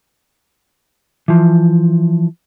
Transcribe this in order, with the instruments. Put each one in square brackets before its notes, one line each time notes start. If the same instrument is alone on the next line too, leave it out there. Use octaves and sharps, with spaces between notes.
[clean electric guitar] E3 F3